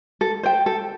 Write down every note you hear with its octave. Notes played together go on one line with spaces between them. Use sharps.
A4
C5 G5
A4